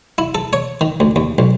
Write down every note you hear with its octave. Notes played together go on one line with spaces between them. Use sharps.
E4
A4
C#5
D#3
D2
D#2
B1